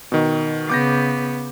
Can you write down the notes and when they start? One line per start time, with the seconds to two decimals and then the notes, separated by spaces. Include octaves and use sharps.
0.12 B2 D#3
0.70 C#3 B3 D6 G6 A#6